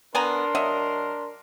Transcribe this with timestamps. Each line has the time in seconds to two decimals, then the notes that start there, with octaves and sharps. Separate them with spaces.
0.15 B3 D4 A#4 G#5 A#5 C6
0.55 F#3 D#5 E5